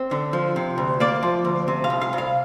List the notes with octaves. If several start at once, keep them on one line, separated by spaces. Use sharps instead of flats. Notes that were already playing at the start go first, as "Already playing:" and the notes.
Already playing: C4
D3
F3
C3
D2
A#3 D5
F3
D2
C3
F5
C2
F5
C2
F5